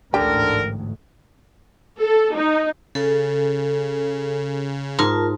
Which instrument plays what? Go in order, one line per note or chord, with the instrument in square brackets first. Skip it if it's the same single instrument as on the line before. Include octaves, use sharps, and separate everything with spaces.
[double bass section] A1 D2 G#2 [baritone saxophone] D3 [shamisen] G4 [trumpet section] A#4
[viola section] A4
D#4
[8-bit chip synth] C#3 [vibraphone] A4
[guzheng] G#2 [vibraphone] F4 A#4 A5